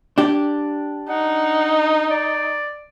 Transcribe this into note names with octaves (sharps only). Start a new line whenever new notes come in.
D4 G4
D#4 F#5
D5